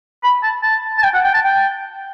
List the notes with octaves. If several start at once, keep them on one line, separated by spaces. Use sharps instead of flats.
B5
A5
A5
A5
G5
F#5
G5
A5
G5